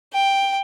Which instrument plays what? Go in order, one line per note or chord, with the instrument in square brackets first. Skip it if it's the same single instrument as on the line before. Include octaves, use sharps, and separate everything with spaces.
[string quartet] G5